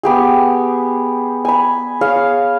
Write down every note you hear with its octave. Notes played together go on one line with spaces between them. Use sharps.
B3 G4 G#4
G#5 B5
G#4 C#5 F5